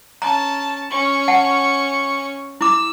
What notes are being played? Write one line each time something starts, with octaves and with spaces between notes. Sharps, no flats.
C#4 A5 A#5
C#4 C#6
F#5 A5
E4 D6 E6